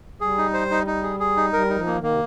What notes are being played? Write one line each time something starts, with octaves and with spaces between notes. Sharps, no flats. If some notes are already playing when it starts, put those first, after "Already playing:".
G3 G#4
D#4
C5
D#4
D#4
G#4
G#4
D#4
G3 A#4
D#4
F3
A#3
D#3
A#3
C3